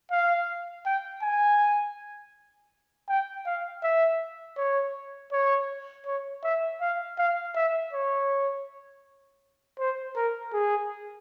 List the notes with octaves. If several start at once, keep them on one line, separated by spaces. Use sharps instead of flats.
F5
G5
G#5
G5
F5
E5
C#5
C#5
C#5
E5
F5
F5
E5
C#5
C5
A#4
G#4